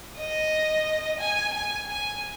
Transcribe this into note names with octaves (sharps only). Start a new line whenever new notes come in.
D#5
G#5
G#5
G#5